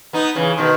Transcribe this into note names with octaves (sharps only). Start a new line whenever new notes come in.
B3 D#4
C#3 E3
B2 D#3